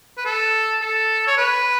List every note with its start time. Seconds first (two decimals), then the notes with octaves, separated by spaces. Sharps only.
0.18 B4
0.25 A4
0.82 A4
1.27 C#5
1.38 B4